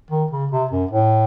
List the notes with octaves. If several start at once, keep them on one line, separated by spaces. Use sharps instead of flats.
D#3
C#3
C3
F#2
A2